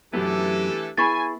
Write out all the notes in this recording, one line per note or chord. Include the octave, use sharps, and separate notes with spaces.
F#2 E3 F#3 A3 B3 D4 G4 A4
B3 E4 G#4 G#5 B5 C#6 A6